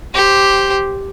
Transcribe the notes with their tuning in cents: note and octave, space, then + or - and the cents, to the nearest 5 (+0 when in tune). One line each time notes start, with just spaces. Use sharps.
G4 +0 C5 +0